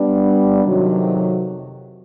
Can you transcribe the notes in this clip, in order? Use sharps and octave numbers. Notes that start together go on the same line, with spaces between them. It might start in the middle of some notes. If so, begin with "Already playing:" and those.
Already playing: G3 B3 D4
F2 C3 D#3 F#3